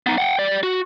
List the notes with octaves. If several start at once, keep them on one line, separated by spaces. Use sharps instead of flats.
B3 D#4
F#5 G5
G3 D5
F#4